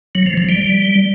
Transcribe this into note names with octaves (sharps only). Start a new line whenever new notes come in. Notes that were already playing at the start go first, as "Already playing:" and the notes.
F#3
F3
F3
G3